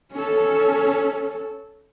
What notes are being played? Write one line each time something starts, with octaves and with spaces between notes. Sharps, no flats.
C#4 A4